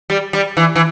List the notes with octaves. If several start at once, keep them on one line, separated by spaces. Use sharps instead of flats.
G3
G3
E3
E3